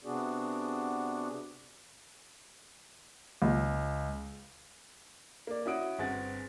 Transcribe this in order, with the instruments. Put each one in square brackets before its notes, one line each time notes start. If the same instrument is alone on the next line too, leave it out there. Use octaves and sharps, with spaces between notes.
[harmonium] C3 B3 D4 F#4 G#4 D5
[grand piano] C#2
A#3 D5
C#4 E4 F#4 D#6 D7
G1 C4 G#4 F#5 A6